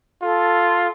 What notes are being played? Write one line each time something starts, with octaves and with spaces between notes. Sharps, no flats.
F4 A4